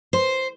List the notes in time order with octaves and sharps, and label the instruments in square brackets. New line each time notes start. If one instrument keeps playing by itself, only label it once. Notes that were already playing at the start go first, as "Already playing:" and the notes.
[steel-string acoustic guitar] C5